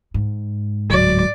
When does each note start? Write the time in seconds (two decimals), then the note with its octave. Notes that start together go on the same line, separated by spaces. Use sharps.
0.14 G#2
0.90 D1 F#3 D5